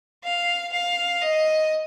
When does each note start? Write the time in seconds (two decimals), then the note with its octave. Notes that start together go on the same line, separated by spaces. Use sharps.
0.24 F5
0.73 F5
1.22 D#5